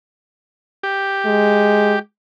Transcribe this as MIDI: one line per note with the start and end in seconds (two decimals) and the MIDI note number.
0.83 1.99 67
1.26 1.97 56